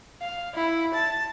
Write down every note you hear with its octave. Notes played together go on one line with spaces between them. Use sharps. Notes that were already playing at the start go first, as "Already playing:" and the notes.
F5
E4
A5